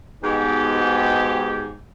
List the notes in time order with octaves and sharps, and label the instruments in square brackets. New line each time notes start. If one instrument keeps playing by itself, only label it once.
[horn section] G#2 B2 G4